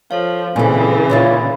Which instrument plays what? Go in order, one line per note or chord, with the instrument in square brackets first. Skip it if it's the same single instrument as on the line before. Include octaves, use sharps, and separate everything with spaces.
[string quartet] F3 [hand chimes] A4 C#5 F5
[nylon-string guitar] A#2 A4 [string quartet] C#3 E3 [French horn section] C4 [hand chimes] G#5
[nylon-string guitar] A#2 D3 E5 [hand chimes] C#4 B5 A6 [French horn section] F4 C#5